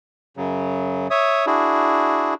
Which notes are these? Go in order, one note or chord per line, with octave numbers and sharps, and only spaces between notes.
F#2 C#3 F#3
C#5 E5 D#6
D4 E4 F#4 G#4